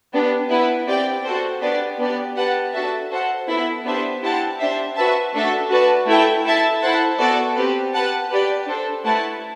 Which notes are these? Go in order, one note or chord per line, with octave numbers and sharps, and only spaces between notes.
B3 D4 G4
B3 E4 B4
C4 G4 D5 G5
F#4 A4 C5
B3 D4 G4 B4 D5
B3 D4 G4 D5
G4 B4 F#5 A5
D4 F#4 A4 E5 A5
F#4 A4 C5 F#5
B3 E4 A4 E5
B3 D4 G4 C5 E5
E4 G4 C5 F#5 A5
D4 G4 C5 E5
F#4 B4 E5 A5
A3 D4 F#4 A4 E5
F#4 B4 D5 A5
A3 E4 A4 E5 G5
E4 A4 E5 A5
E4 A4 C5 F#5 A5
B3 F#4 A4 D5 A5
C4 G4 B4
G4 B4 F#5 A5
G4 B4 D5
D4 A4 C5
A3 E4 B4 F#5 A5